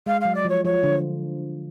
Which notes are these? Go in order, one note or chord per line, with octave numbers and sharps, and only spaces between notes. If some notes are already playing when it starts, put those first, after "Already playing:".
G#3 F5
F#3 F5
D5
F3 C#5
F3 C#5
D3